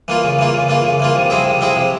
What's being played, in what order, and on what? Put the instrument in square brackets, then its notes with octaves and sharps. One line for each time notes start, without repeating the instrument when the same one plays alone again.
[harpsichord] E3 A#3 F4
C#3
E3 A#3 F4
C#3
E3 A#3 F4
C#3
E3 A#3 F4
C3
F3 C4 E4 G#4
C3
F3 C4 E4 G#4
C3